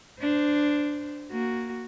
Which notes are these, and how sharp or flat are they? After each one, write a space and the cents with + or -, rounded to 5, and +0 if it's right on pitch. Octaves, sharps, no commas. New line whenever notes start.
D4 +0 C5 -20
A#3 +0 F#4 +0